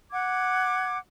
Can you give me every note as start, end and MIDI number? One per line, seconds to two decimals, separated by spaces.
0.11 0.97 78
0.11 0.97 86
0.11 0.97 92